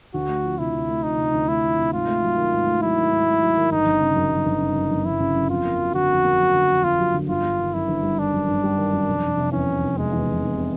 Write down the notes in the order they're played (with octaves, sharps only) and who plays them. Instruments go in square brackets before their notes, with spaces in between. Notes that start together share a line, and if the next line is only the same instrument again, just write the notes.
[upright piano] D2 [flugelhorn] F#4
[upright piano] A3
F3
[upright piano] C3 [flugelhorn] E4
[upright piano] D2
A3
[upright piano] F3 [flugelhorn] D#4
[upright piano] C3
D2
[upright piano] A3 [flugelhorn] E4
[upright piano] F3
C3
[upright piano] G#2 [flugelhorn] F4
[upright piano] A3
F#3
D#3
G#2
A3
[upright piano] F#3 [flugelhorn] E4
[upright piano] D#3
G#2
A3
F#3
D#3
[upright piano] G1 [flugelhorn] D#4
[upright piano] G1
C#3
F#2
G1
G1
C#3
F#2
G1
[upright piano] G1 [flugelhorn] E4
[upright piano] C#3
F#2
[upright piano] F2 [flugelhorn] F4
[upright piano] A#3
F#3
[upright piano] D3 [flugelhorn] F#4
[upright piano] F2
A#3
F#3
D3
F2
[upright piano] A#3 [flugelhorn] F4
[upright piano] F#3
D3
[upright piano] G1 [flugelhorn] F4
[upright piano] G3
D#3
[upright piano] F#2 [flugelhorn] E4
[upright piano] G1
G3
[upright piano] D#3 [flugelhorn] D4
[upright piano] F#2
G1
G3
D#3
F#2
F1
F1
C3
[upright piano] E2 [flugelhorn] C#4
[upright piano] F1
F1
[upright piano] C3 [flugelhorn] G#3
[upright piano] E2
F1
F1
C3